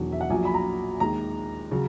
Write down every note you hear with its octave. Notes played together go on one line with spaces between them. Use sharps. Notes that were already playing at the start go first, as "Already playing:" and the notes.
Already playing: E1 E2 D#3 F#3
E5
F#5
A#1 A#2 F#3 G#5
B5
A#5
D#2 D#3 G#3 A#5
C#3 F#3